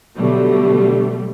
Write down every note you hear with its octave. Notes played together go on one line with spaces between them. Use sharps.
B2 D3 F#3 G3 A3